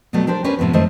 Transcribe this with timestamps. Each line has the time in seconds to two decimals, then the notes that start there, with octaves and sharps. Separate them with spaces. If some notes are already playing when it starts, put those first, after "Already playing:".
0.13 B2 F#3 G3 A3 B3
0.27 D4 G4 A#4 C5
0.44 C#4 D4 G4 A#4 B4
0.59 A2 C3 F3 B3
0.73 F#2 D#3 A3 C5 D#5